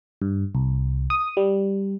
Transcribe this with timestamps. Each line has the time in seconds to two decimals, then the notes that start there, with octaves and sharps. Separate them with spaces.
0.22 G2
0.55 C2
1.10 D#6
1.37 G3